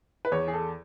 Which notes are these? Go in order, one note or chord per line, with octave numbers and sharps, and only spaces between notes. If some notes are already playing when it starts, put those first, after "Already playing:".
B4
E2 C#5
G#4
A4